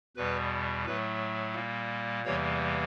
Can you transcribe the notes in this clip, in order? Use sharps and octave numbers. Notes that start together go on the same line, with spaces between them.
E2 B2 G3 B4
A2 F#3 A3 B4
A#2 G3 A#3
E2 C3 E3 G3 A#3 C#5